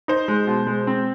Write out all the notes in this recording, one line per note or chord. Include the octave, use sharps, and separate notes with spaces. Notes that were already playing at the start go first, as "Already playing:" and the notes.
D#4 C5
G#3
B2
G#3
C4